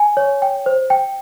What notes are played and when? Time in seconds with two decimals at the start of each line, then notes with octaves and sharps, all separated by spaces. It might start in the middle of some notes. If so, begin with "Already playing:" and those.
Already playing: G#5
0.17 C#5
0.42 G5
0.66 C5
0.90 G5